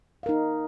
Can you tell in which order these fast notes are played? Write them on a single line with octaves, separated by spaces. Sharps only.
F5 A#4 D#4